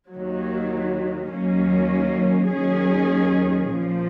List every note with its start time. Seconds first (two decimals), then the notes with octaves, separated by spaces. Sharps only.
0.10 D#2 D#3 F#3
1.29 D#2 D#3 F#3 A#3 C#4
2.49 D#2 D#3 F#3 C#4 G#4
3.69 A#1 A#2 F3